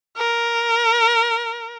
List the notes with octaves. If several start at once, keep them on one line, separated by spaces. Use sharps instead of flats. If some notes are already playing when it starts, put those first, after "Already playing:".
A#4